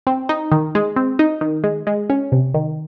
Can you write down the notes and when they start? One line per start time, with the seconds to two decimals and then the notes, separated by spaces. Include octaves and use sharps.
0.07 C4
0.29 D#4
0.52 D#3
0.75 G#3
0.96 C4
1.19 D#4
1.41 D#3
1.64 G#3
1.87 G#3
2.10 C#4
2.32 C3
2.54 D#3